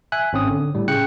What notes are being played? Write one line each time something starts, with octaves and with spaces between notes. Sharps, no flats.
E5 G#5 F#6
G#1 C4 C#4 D#6
D3
A2 G3
C#3 G5 F#6 C#7